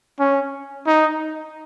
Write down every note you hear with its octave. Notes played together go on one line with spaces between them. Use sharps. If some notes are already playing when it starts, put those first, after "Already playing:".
C#4
D#4